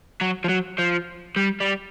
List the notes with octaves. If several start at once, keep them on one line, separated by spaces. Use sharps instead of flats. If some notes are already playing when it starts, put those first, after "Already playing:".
F#3
F3
F#3
F3
G3
G3